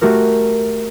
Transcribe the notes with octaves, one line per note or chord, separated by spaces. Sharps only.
A3 F#4 G4 A#4